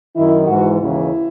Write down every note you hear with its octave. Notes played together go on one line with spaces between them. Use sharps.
F#2 D#3 E4
G#2 E3 F#4
D#2 C#3 E3 E4